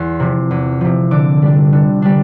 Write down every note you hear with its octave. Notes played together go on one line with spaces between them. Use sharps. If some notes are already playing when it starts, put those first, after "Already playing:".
Already playing: E2 C6
C3 F3
E2
C3 F3
D3 D6
G3 D4
D3
G3 D4